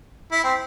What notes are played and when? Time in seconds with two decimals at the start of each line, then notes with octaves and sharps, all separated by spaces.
0.32 E4
0.44 C4